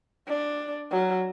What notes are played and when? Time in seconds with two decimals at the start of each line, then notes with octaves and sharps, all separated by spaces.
0.27 D4
0.92 F#3